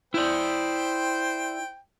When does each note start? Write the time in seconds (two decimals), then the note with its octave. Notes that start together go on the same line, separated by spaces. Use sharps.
0.14 E4 C5 D5 G5